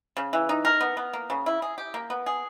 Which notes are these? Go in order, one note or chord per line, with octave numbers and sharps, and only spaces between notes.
C#3
E3
D#4
A#4
B3
B3
A#3
C#3
E4
G#4
G4
A#3
B3
G#4